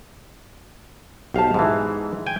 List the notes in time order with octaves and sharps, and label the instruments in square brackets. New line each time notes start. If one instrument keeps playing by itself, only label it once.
[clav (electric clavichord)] B1 F5 [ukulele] G4 C5 A5
[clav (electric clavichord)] G#2 E3
G5 G#5